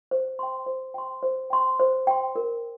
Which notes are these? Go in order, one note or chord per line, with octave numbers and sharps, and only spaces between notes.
C5
G5 C6
C5
G5 C6
C5
G5 C6
C5
G5 C6
A#4